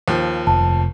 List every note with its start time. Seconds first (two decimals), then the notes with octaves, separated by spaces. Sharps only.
0.08 D#2 F3
0.47 F1 A5